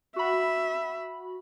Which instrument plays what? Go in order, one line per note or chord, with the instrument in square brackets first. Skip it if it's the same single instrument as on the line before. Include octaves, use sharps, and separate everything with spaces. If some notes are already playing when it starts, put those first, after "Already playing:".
[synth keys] F#4 B5 [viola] E5